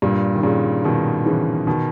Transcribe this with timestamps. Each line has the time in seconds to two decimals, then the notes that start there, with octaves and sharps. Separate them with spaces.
0.02 G2 A#2
0.35 D#3
0.43 A#2 C#3
0.84 B2 D#3
1.26 C#3 E3
1.67 B2 D#3